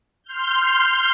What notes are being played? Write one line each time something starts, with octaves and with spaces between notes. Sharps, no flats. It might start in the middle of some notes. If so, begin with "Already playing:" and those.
C6 F6 G6